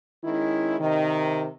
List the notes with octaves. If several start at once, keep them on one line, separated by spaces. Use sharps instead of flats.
D#3 G#3 C#4 E4
C3 D#3